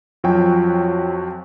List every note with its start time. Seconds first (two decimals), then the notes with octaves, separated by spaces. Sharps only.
0.24 F2 F3 F#3 F#4 G5 G#5